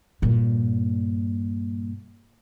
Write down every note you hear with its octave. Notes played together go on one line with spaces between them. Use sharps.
G2 A#2